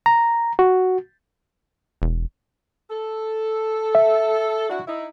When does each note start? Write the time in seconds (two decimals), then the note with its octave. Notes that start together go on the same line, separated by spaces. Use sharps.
0.06 A#5
0.59 F#4
2.02 E1
2.90 A4
3.95 E5
4.70 D4 E4 F#4
4.87 D#4 E4